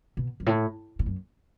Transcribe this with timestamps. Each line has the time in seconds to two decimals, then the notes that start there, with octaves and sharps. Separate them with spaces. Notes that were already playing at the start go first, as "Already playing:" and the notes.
0.17 B2
0.40 F#2
0.46 A2
0.99 A2
1.06 F#2